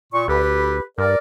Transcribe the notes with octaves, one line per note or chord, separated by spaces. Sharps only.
A#2 C#6
D2 G4 A4 B4
G2 A#4 D5